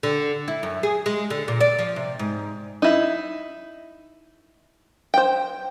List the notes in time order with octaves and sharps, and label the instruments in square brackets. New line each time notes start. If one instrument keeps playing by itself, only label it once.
[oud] D3
E4
F#2
G#4
G#3
D3
A#2
D5
F3
C3
G#2
[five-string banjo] D#4 E4
C5 G5